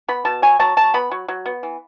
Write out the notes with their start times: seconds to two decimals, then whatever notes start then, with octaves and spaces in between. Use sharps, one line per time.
0.08 B3 B5
0.25 B2 A5
0.42 F#3 G#5
0.59 F#3 A5
0.77 F#3 A5
0.94 B3 B5
1.11 F#3
1.28 F#3
1.46 B3
1.63 E3